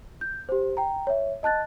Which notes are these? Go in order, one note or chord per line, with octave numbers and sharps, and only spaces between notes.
G6
G4 C5
G5 A#5
C#5 E5
D#5 A5 F#6 A6